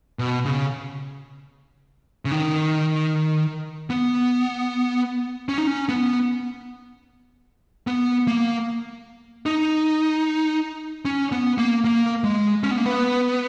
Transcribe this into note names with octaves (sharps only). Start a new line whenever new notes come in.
B2
C#3
C#3
D#3
B3
C#4
D#4
C#4
B3
B3
A#3
D#4
C#4
B3
A#3
A#3
G#3
C#4
B3
A#3
B3